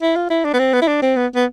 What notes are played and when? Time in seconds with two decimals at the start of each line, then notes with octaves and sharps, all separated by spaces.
0.02 E4
0.16 F4
0.30 E4
0.45 D4
0.54 B3
0.59 C4
0.73 B3
0.82 E4
0.88 D4
1.02 C4
1.17 B3
1.35 B3